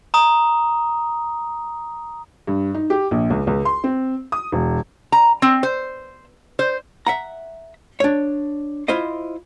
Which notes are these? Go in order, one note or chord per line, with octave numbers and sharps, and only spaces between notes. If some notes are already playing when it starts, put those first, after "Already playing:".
A#5 D#6
G2
D#4
G4
A#1
C#2
C#2
C6
C4
D#6
E1
A#5
C4
C5
C5
E5 F#5 A#5
D4 C#5
E4 F4 C5 D#5